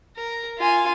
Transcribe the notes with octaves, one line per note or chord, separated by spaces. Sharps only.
A#4
F4 G#5